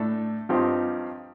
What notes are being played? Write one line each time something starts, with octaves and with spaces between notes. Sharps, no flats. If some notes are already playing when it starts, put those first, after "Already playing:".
Already playing: A2 A3 D4 A4
G2 F3 C4 D#4 G4